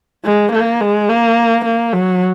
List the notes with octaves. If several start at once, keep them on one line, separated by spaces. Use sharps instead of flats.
G#3
A#3
G#3
A#3
A#3
F#3